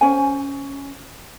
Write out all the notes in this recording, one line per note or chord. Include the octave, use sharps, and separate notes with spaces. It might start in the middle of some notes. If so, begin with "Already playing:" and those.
C#4 C5 G#5